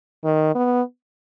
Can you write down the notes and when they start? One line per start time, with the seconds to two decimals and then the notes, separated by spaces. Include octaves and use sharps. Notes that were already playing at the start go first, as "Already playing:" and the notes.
0.25 D#3
0.55 B3